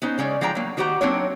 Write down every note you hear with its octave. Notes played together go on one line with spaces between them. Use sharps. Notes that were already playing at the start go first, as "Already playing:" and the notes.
B3 C#4 D#4 C5
C#3 G#3 C#4 D5
F3 G#3 D4 G5 A#5
F#3 A#3
D#3 F#4 G4 C5 F#5 A#5
F#3 A#3 C4 D4 D#4 C#5